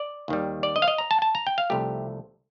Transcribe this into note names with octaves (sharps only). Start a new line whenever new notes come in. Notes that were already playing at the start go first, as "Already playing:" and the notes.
Already playing: D5
D#2 D#3 G3
D5
D#5
F5
D#5
A#5
A5
A5
A#5
G5
F5
C2 C3 F3 A3 G4